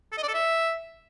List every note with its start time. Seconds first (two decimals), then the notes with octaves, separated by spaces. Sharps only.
0.12 A4
0.18 D#5
0.23 D5
0.28 A4
0.34 E5